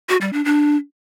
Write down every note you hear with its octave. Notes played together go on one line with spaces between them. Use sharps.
F#4
G3
D4
D4